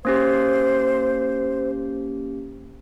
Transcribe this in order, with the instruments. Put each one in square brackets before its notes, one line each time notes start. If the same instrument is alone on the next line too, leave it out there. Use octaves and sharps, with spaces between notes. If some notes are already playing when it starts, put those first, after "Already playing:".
[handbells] A#3 C#4 G4 [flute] C5